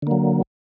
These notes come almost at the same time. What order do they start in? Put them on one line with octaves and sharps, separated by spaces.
D3 A#3 F#3